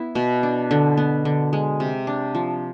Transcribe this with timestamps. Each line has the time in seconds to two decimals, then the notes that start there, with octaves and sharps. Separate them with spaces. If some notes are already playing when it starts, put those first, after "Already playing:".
Already playing: B3 E4
0.15 B2
0.43 D4
0.71 D3
0.97 B3
1.25 D3
1.53 G#3
1.80 C3
2.07 D4
2.35 F3